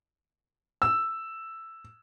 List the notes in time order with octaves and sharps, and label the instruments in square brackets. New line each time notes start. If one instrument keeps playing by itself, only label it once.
[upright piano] E6